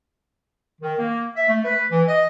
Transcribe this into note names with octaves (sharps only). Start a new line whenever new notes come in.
D#3
A#3
E5
A3
B4
E3
D#5